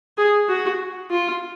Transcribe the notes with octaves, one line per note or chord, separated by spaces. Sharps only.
G#4
F#4
F4